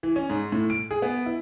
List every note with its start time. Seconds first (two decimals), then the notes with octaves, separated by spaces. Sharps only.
0.03 E3
0.16 C#4
0.30 G#2
0.52 A2
0.70 D7
0.91 G#4
1.02 B3
1.26 E4